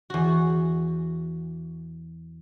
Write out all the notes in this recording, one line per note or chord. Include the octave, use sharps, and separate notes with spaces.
E2 F#4